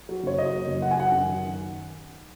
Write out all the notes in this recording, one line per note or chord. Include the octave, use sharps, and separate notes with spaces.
F#3
F#1 C#5
F#3 D#5
A#3
F#1
F#2 F#5
G#5
F#3 F#5
F#2
D#3